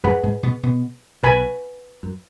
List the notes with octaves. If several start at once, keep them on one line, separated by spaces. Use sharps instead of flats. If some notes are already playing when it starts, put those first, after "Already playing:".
F#2 F#3 G#4 B4 F#5 B5
G#2 G#3
B2 B3
B2 B3
B1 B2 B4 G#5 B5
F#2